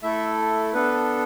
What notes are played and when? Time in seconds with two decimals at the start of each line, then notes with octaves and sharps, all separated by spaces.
0.03 A3 E4 A4 E5
0.73 B3 D4 A4 B4